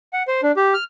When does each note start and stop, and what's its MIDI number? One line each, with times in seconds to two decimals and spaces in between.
0.13 0.23 78
0.28 0.41 72
0.43 0.52 62
0.57 0.74 67
0.74 0.84 89